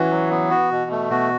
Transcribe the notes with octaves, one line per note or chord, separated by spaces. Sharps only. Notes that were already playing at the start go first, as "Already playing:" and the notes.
Already playing: E3 C#4 F#4
F#3
B3
F#4
B2
A3
B2 F#4